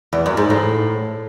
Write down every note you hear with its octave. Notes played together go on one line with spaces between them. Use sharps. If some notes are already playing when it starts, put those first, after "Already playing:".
E2
F#2
G#2
A2